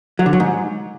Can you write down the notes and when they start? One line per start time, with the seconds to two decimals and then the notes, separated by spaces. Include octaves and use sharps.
0.19 F#3
0.26 D3
0.33 F#3
0.40 G#2